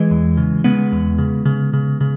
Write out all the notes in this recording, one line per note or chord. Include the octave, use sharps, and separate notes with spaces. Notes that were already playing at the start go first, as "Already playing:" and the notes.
Already playing: E3 G#3
E2
C#3
C#3 G#3 B3
E2
C#3
C#3
C#3
C#3